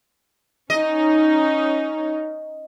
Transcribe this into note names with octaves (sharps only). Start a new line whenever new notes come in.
C#4 D#4 D#5